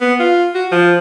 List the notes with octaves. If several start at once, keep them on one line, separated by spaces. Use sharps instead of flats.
B3
F4
F#4
F3